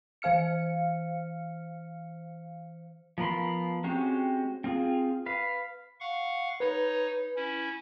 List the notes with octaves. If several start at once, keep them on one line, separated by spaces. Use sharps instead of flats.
E3 C5 F5 F6 C#7
F3 B3 A#4 B5 C6
G#3 C4 C#4 F#4 G4
C4 F4 G#4
B4 F5
F5 F#5 C#6
D#4 B4 C#5
C#4 E4